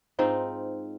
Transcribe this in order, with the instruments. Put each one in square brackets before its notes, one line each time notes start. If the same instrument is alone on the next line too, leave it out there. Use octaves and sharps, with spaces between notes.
[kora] G#2 C4 D#4 F4